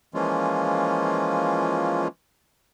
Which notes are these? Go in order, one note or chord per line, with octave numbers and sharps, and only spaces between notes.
E3 F3 G#3 A#3 C#4 F4